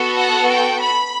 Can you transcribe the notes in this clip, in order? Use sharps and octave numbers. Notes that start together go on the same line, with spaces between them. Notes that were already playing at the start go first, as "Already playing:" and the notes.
Already playing: B3 F#4 A4
F#5
G5
B5